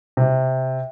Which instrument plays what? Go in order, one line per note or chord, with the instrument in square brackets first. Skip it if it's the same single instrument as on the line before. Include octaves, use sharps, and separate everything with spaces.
[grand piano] C3